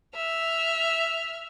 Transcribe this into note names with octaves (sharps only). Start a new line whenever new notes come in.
E5 F6